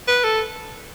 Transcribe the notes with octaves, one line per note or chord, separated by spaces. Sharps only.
B4
A4